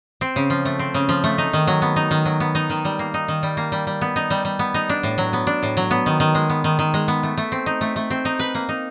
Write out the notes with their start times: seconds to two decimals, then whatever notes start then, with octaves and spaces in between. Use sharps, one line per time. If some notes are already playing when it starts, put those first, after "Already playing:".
0.21 C4
0.36 C#3
0.50 F3
0.65 A3
0.79 C4
0.94 C#3
1.09 F3
1.24 A3
1.38 D#4
1.53 D#3
1.67 F#3
1.82 B3
1.96 D#4
2.11 D#3
2.26 F#3
2.40 B3
2.55 D#4
2.70 D#3
2.85 G3
2.99 A#3
3.14 D#4
3.28 D#3
3.43 G3
3.57 A#3
3.72 G3
3.87 G3
4.01 B3
4.16 D#4
4.30 G3
4.45 G3
4.59 B3
4.74 D#4
4.90 D4
5.03 A2
5.18 F#3
5.33 B3
5.47 D4
5.63 A2
5.77 F#3
5.91 B3
6.06 D#3
6.20 D#3
6.35 G#3
6.50 B3
6.64 D#3
6.79 D#3
6.94 G#3
7.08 B3
7.23 A3
7.38 A3
7.52 C4
7.66 D#4
7.81 A3
7.96 A3
8.11 C4
8.25 D#4
8.39 B4
8.55 A#3
8.69 D#4